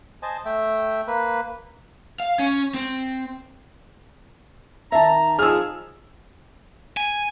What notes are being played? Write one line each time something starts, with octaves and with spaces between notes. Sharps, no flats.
C5 D#5 G#5 A5
A3 E5 G5
A#3 B4
F5
C#4
C4
D#3 E5 A5 A#5
F3 D#4 G#4 E6 F6
G#5